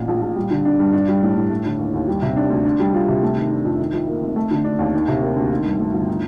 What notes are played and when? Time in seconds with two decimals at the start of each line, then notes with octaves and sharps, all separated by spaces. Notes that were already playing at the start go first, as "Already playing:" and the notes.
Already playing: A1 A#2 F3
0.08 A#1
0.21 A#1
0.36 G3
0.51 D3
0.65 D4
0.79 G2
0.93 D4
1.08 G3
1.22 A2
1.36 A2
1.50 A3
1.65 D3
1.79 D#2
1.94 D#2
2.08 G3
2.22 C3
2.36 D4
2.50 D2
2.65 D4
2.80 G3
2.94 F4
3.08 C3
3.22 A3
3.36 D#3
3.51 D4
3.65 F2
3.79 D#3
3.93 F2
4.08 A#3
4.22 F1
4.36 A3
4.51 D3
4.64 D4
4.79 D#2
4.94 D#3
5.08 C3
5.21 A#3
5.36 D2
5.51 D#3
5.65 G2
5.80 A3
5.94 G1
6.08 D#4